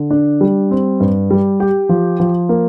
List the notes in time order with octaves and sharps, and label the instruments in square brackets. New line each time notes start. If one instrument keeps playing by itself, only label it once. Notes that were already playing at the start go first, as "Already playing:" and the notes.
Already playing: [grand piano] D3
D4
G3
C4
G2
G3
G4
F3
F3
A#3